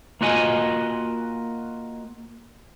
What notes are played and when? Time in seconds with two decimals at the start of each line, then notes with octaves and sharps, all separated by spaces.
0.21 A#3 F4 F#4 D#5 G#5